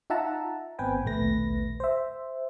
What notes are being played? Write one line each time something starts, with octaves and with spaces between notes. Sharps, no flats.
D#4 F4 E5 F#5 A5 A#5
G#1 B3 C4 B4 G5 G#5
A#1 D#2 B2 A3 B4 A#6
C5 E5